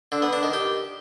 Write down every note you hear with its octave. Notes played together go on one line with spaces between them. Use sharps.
D3
B3
D4
D#3
G4